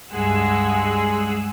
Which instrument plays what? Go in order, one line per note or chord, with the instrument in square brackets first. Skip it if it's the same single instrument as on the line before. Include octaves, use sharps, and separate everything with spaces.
[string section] C#2 G2 G#3 G#4 F#5 E6